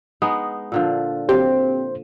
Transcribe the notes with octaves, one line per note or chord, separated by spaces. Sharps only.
G#3 B3 D#4
A#2 D3 F3
G1 F#3 C4 G4 C5